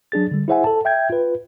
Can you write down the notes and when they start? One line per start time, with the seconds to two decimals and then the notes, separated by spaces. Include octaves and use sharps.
0.12 F#3 D4 G#4 A6
0.31 D3 G3
0.48 E4 G#4 C5 E5 F#5 G#5
0.64 A4 A5
0.85 E5 G5 G6 G#6
1.10 F4 B4